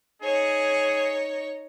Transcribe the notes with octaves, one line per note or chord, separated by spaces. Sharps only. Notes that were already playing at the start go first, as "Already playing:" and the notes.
D#4 G#4 C#5